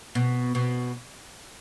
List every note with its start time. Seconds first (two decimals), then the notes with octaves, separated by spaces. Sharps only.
0.15 B2
0.55 B2